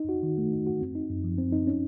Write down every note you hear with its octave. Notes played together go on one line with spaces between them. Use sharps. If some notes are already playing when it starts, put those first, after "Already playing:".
Already playing: D#4
F#4
D#3
A3
D#4
F#4
C4
D#4
F#2
F3
C4
D#4
C#4